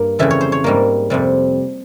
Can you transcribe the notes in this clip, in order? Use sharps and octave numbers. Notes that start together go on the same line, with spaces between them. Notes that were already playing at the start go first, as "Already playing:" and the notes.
Already playing: G2 A#3
F2 C#3 E3 G3 E5
C#5
C5
C#5
G#2 G3 A#3
F2 C3 G3